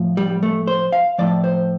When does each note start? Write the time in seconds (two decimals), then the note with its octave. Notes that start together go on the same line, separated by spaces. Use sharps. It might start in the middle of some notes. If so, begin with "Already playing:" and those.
Already playing: A2 F3
0.17 G3
0.43 A3
0.67 C5
0.92 F5
1.18 A2 F3 D5
1.44 C5